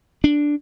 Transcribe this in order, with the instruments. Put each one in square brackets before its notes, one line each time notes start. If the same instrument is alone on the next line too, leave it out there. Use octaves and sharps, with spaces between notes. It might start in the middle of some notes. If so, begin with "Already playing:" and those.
[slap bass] D4